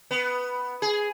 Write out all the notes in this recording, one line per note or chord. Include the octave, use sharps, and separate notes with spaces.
B3
G#4